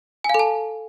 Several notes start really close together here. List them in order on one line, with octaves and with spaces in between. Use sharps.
G#5 F5 A4 A5